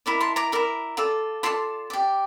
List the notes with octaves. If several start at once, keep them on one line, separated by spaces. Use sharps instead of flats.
E4 A#4 D5
A5 C6
A#5 D6
E4 A#4 D5
F4 A4 D5
F4 A4 D5 A5 C6
G4 D5